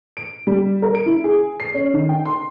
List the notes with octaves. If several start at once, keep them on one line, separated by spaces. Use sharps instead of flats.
D7
G3
A#4
D7
E4
G#4
C7
C#4
D#3
G5
C6